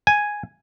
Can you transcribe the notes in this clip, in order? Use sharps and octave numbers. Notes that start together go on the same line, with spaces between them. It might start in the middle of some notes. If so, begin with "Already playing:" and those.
G#5